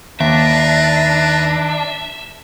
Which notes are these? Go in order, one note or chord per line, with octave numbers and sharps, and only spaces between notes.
D#2 D4 B4 E5 A5 A#5